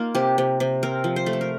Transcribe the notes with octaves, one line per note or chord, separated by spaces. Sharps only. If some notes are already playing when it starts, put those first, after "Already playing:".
Already playing: A#3 D#4 F4
C3 G4
C3
C3
C4 A#4
F3
C5
A3
A4
A#4